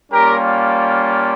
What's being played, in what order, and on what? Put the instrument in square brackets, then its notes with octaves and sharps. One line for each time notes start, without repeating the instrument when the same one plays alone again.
[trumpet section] G3 A#3 C#4 F4 G4 A#4